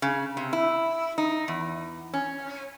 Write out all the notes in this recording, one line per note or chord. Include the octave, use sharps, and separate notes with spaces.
C#3
C3
E4
D#4
E2
C#4